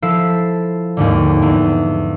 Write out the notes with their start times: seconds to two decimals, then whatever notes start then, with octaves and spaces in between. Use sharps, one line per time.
0.02 F3 E4 A4 E6 C7
0.97 D#2 G#2 D3
1.42 E2